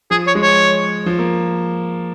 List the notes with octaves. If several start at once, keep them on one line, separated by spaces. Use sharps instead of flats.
F3 G#4
C#5
G#3
C#5
F3
A#3